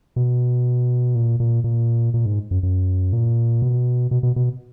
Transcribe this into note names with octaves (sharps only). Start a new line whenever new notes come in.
B2
A#2
A#2
A#2
A#2
G#2
F#2
F#2
A#2
B2
B2
B2
B2